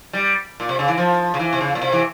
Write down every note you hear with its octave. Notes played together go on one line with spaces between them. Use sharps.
G3
A#2
C3
C#3
E3
F3
C#3
E3
C3
C#3
A#2
C3
E3